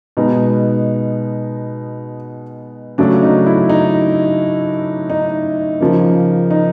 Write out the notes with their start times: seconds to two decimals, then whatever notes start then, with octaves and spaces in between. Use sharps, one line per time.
0.17 B2 G#3 B3 D#4
2.98 C#3 F#3 A3 D4
3.23 D#4
3.46 E4
3.69 D#4
5.10 D#4
5.81 C#3 F3 A#3
6.51 D#4